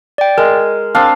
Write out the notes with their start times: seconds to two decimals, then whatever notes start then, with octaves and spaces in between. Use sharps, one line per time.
0.18 D5 G5
0.38 G#3 A#4
0.95 C4 D4 F5